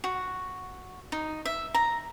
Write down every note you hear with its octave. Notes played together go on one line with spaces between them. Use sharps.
F#4
D#4
E5
A#5